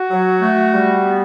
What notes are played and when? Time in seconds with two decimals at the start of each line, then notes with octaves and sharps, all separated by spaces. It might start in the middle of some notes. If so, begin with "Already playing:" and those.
Already playing: F#4
0.10 F#3
0.41 A3
0.72 G3
1.03 B3